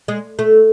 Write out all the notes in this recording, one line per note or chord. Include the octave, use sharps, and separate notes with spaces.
G#3
A3